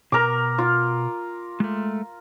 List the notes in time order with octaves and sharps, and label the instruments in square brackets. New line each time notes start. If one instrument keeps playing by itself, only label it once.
[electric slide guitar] B2 A#5 [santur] A#4 D6
[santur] F4
[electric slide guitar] G#3 A3